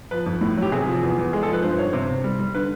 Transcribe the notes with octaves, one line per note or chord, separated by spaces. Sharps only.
F3 B4
F2
A2
F#3
G4
C3 G#4
F3
E2
E2
G#3 G#4
A4
F3 B4
G2 C5
G2 C#5
C3 C5
C3
G3
G3
D3 B4